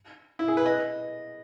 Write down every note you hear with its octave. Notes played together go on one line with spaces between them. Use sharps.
E4
G#4
B4
D#5